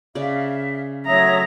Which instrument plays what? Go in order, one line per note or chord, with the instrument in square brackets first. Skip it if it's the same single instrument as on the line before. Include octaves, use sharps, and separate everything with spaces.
[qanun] C#3 D5 [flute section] E5 F5
[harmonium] F#3 A3 E5 [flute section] C#5 D#6 [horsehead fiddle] A#5